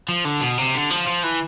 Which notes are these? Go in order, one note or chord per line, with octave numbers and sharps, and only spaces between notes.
F3
D3
B2
C3
D3
F3
F3
E3